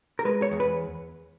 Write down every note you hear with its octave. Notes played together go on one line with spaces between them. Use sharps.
A#4
G#3 B4
C#5
E2
B4